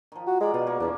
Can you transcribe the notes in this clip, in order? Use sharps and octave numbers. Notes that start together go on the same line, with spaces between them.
D#3 F3
F#4
G#3 A#4 D5
B2 F4 F#4
A#3
E2 A#3 C#4 D4